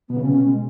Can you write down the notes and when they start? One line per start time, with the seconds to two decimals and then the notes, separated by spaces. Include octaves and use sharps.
0.09 B2 B3
0.17 C#3
0.21 C#4
0.25 B2
0.32 C#4
0.45 G#3